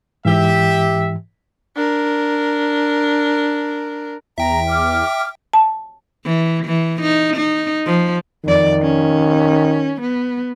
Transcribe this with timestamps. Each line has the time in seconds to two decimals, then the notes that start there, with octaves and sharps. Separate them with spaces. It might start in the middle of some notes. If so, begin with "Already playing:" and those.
0.25 G#2 E3 G4 E5
1.76 D4 A#4
4.38 E2 E5 G5 A#5
4.68 D6 F6
5.53 A5
6.25 E3
6.66 E3
7.02 D#4
7.37 D#4
7.86 F3
8.44 F2 D#3 D5
8.82 C#4
10.01 B3